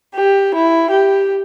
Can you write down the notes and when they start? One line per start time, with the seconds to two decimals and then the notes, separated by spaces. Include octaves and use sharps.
0.15 G4
0.54 E4
0.91 G4